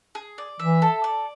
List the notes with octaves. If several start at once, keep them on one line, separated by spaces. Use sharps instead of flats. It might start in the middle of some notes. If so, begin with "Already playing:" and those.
G#4
D5
E3 E5
A4
D5